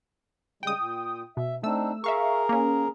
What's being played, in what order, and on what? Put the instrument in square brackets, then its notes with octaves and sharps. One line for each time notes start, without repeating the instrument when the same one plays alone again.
[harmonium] C#3 G3 G#3 [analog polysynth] G5 D#6
[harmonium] A#2
[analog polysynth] B2 [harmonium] E5
[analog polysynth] A3 E6 [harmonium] C4 D4 D#4
[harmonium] G#4 A#4 A#5 [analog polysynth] E5 F5 C#6
[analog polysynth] A#3 C#4